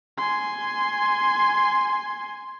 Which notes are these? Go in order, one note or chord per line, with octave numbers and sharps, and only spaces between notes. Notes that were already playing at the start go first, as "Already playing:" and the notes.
G#5 C6